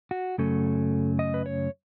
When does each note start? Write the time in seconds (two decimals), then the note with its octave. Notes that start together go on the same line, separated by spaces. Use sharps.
0.11 F#4
0.38 F#2 C#3 F#3 A3 C#4 A4
1.19 D#5
1.34 B4
1.46 C#5